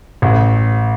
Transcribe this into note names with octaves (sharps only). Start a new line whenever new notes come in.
A1